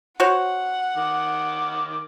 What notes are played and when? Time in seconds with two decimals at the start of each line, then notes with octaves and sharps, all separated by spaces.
0.20 F#4 C5 C#5 F#5
0.97 D#3 D6